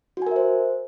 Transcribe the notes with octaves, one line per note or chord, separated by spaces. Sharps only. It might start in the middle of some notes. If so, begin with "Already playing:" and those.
F#4 A#4 C5 E5 G#5